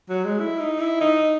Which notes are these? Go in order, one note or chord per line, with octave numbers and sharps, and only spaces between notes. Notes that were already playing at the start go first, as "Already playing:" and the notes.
F#3
G#3
E4
D#4
E4
D#4